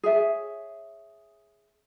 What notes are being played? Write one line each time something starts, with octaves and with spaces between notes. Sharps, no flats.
G#4 C#5 E5